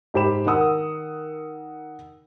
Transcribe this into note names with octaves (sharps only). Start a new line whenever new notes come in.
G#2 G#3 G4 C5 B5 E7
D#3 A#4 F#5 D#6 E6